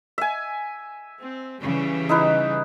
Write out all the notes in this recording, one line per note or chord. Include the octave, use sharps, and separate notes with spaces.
E5 G#5
C4
C#3 E3 G3
D#4 E4 B4